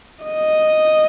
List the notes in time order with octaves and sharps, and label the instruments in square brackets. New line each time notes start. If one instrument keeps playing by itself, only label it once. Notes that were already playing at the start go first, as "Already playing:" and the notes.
[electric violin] D#5